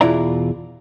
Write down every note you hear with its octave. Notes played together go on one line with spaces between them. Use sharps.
E2 B2 E4 F4 D5 A#5